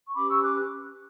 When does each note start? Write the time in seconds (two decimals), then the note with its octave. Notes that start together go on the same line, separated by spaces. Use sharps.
0.06 C#6
0.14 C#4 G4 B4 B5 D6
0.28 C#6 E6
0.42 D6 F#6